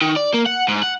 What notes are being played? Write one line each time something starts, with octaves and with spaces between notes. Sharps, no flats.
D#3
D5
A#3
F#5
G#2
F#5